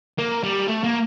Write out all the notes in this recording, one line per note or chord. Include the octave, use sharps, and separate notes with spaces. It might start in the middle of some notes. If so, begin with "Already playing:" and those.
A#3
G3
A3
A#3